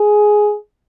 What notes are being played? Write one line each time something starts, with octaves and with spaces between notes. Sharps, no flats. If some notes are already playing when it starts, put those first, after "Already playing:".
Already playing: G#4